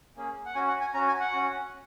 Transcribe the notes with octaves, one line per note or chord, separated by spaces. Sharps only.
A#3 C#4 G#4
F#5
C#4 F#4 G#5
F#5
G#5
C#4 F#4 A#5
G#5
F#5
C#4 F#4